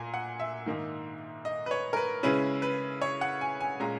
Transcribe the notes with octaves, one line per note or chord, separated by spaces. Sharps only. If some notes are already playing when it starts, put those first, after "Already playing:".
Already playing: A#2 G#5 A#5
F#5
E5
G#2 D#3 A#3 D#4
D#5
B4
C#5
A#4
B4
C#3 G#3 C#4 E4 B4
B4
C#5
F#5
G#5
G#5
A#2 G#3 C#4 A#5